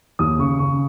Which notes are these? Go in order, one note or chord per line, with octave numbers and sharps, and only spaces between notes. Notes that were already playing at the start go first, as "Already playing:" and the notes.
D#2 D#6
C#3 C#6
C#3 C#6